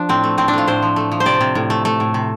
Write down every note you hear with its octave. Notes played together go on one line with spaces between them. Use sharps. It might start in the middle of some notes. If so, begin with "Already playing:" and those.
Already playing: F3 D4
A2 C4
A3
A2 C4
D4
A3 F4
A2 C5
F3
A3
F3
C5
C3 D5
C3
A2
A3
A3
A2
C3